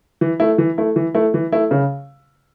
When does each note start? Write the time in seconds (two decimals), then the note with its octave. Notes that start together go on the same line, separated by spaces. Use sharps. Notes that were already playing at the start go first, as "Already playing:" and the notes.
0.21 E3
0.40 A3 E4
0.58 E3
0.78 A3 E4
0.96 E3
1.14 A3 E4
1.34 E3
1.52 A3 E4
1.71 C#3